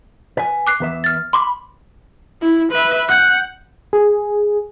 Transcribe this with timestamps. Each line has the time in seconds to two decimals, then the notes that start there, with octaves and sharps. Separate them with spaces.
0.37 B4 G#5
0.67 D6 F#6 C7
0.80 E2 B4 E5
1.04 F6 A6
1.33 B5 C6 D6
2.41 E4
2.72 B4 E5
3.09 F#5 F#6 G6
3.93 G#4